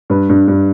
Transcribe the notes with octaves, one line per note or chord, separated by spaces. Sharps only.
G2 B4
G2
G2